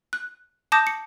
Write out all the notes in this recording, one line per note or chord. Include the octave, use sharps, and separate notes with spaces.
F#6
A5 D6 D#6 G6 A#6
C#7